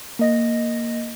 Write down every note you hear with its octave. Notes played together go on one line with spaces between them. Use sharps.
A#3 D#5 A#6